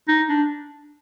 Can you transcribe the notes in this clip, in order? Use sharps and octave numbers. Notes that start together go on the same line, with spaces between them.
D#4
D4